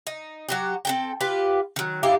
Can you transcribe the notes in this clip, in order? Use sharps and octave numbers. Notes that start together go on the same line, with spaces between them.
D#4
F#3 F#4 G4
C4 A4 G5
F4 G4 B4
D#3 F#3
D#4 E4 G4 F5